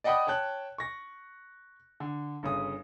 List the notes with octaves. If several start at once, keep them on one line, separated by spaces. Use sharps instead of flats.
D5 D#5 F#5 G5 B5 D#6
C#5 G5 A5 F#6
C#6 A#6
D3
G1 C#3 D#6